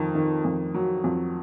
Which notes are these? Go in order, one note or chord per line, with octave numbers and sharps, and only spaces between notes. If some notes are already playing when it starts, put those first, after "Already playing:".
Already playing: F2 D#3
D#3
F2
F#3
F2